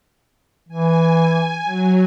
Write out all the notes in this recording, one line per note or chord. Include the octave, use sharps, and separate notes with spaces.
E3 G#5
F#3